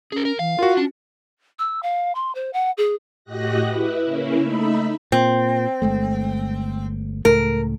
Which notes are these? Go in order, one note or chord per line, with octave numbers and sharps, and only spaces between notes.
C#4 G#4 A#4
A#4
E3 F5
F4 F#4 A#4
C#4 D4
E6
F5
C6
C5
F#5
G#4
A2 F#4 G4 D#5 F#6 A#6
E4 B4
C#3 A#3 C#4 E4
A3 D#4 E5 B5
A#2 C4
G1 G#3 A3
C#2 A2 A3 A#4